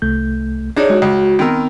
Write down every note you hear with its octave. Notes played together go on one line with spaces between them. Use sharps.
C2 A3 G6
D4 D#4 G#4 C#5 D5
G#3 F#4
C#2 F#4
D#3 B3 C4 A#4 E6